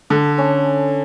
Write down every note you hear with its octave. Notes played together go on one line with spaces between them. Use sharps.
D3 A4
C#4